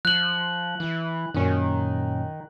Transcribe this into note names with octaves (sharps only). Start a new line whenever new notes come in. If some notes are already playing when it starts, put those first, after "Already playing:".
F3 F#6 F#7
E3
F#2 A#2 D#3 C#4